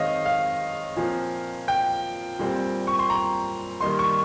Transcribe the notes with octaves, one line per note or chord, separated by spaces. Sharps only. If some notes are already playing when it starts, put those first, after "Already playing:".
Already playing: D#3 G#3 C4 D#4 C#5 D#5 F5
F5
A#2 F3 C4
G5
A#2 G3 C4
C#6
C6
A#5
D#3 G3 A#3 D#4 C6
C#6